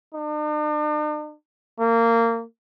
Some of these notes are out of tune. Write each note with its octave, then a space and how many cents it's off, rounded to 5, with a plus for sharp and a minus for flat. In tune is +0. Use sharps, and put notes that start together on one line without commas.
D4 +45
A#3 -20